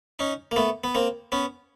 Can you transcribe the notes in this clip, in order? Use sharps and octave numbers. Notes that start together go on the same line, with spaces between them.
C#4 D#4
A#3
A3 B3
B3
A#3 C4
B3 C#4